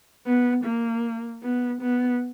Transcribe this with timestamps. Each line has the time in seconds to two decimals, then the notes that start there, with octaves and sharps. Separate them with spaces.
0.26 B3
0.65 A#3
1.43 B3
1.81 B3